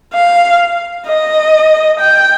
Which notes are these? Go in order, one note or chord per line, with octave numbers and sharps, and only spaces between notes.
F5
D#5
G5